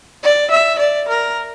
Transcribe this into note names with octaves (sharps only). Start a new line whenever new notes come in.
D5
E5
D5
A#4